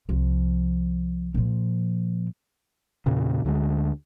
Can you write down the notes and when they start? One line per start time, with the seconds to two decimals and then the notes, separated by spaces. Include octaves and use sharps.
0.09 C2 F3
1.34 A#2 F3
3.06 E2 A#2 C#3
3.45 D2 D3 G3 G#3